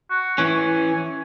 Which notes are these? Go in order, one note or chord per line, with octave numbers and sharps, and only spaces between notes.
F#4
E3 C#4 G#5